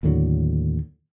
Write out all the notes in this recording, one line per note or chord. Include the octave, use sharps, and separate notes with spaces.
D#2 A2 D3 F#3